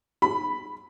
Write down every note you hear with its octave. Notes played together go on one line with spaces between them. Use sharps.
B5